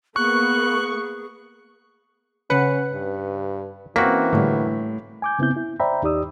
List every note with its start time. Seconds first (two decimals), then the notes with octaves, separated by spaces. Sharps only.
0.16 A#3 B3 G#4 C#6 F#6
2.50 C#3 C#4 B4 F#5 C#7
2.93 G2
3.96 E3 A#3 C4 C#4 F#4 B6
4.33 A2 D3 G3
5.22 G#5 D6 G6
5.39 C#3 B3 C4 E4 G6
5.56 E4
5.80 C5 D5 E5 G5 A#5 B5
6.02 D#2 D#4 G4 D5 D#6 E6